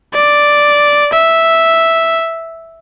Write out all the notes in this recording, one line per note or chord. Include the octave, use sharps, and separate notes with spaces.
D5
E5